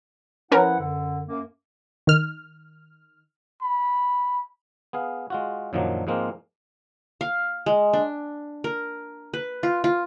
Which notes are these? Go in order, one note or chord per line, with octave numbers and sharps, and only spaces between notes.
F3 C#4 E4 A#4 B4 F#5
F#2 D3
F#2 A#3
D#3 F6
B5
B3 G#4 F5
G#3 F4 F#4
F#2 A#2 D#3 F3 F#3 D4
G#2 F3 G#3 A#3 C4 A#4
F5
G#3
D4
A#4
B4
F4
F4